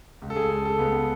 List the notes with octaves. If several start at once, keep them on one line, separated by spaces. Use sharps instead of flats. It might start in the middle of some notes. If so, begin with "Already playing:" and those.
C#2
A4
G#4
C#2 A4
A4
C#2 B3